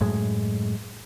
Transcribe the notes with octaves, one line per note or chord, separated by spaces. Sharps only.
F#2 A2 G#3